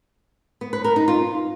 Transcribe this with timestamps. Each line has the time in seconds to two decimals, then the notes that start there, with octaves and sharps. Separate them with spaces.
0.61 B3
0.73 B4
0.84 A#4
0.96 D#4
1.08 F4